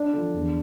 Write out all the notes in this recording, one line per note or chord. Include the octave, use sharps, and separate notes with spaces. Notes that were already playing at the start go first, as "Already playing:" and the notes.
Already playing: D4
D3 F3
E2